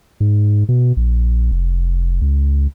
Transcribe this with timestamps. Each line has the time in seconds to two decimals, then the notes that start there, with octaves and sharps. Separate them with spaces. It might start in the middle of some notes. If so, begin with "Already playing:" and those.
0.20 G#2
0.69 B2
0.97 A#1
1.51 F1
2.22 C#2